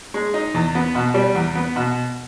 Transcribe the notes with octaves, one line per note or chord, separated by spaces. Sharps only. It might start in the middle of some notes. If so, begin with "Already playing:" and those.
G#3
D#4
E2
B3
B2
G3
E2
B3
B2